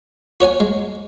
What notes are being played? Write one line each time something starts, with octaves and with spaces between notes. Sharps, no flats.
F#4 C#5 F#5 G#5
G#3